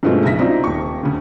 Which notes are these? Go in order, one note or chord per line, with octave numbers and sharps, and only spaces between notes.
G2 B2 F3 G#3 A3 C4
B1 F#2 C#3 E5 A#6 B6
C4 D4 D#4 F4
D#1 C#6
D2 C#3